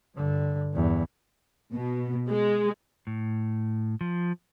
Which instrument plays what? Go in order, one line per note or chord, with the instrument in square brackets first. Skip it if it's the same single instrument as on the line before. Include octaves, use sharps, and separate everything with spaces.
[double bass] G2 D3
E2 G2
[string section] B2
G#3
[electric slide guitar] A2
F3